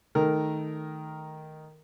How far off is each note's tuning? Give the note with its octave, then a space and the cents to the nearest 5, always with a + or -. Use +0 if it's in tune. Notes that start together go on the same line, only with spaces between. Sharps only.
D#3 +0 A3 -10 A#4 +0